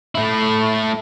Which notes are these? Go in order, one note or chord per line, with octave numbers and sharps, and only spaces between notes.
A3 E4